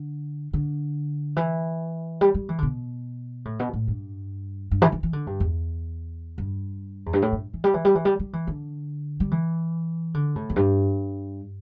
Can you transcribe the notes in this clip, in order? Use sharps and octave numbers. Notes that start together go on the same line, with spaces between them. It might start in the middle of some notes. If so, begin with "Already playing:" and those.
Already playing: D3
D3
E3
G3
G3
E3
D3
B2
A2
B2
A2
G2
G2
E3
E3
E3
D3
G2
E2
G2
E2
G2
A2
G2
E3
G3
E3
G3
E3
G3
G3
E3
D3
G3
E3
D3
A2
E2
G2